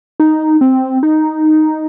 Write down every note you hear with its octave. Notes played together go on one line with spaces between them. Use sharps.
D#4
C4
D#4